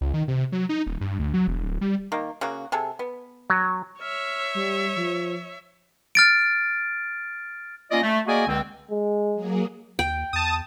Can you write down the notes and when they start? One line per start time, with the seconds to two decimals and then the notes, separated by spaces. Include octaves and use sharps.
0.01 C#2
0.14 D#3
0.28 C3
0.52 F#3
0.69 D#4
0.87 D#1
1.01 G2
1.19 D2
1.34 F#3
1.48 E1
1.64 D1
1.81 G3
2.12 D#3 A#3
2.41 C#3 A#3 F#4
2.72 C3 G#4 A4
2.99 B3
3.50 F#3
4.00 C#5 E5 F6
4.55 G3
4.96 F3
6.15 F6 A6 D7
7.91 A#3 C#4 F4 D5 D#5
8.03 A3
8.27 A#3 F#4 G#4 D5 D#5 G#5
8.46 C#2 D3 C4
8.91 G#3
9.35 F#3 A#3 G#4
9.99 D#2 G5
10.33 E2 A5 D#6